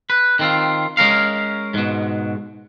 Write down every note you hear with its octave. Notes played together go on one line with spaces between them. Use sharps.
B4
D#3 C4 F4
G#3 C#4 A#4 F5
G#2 B2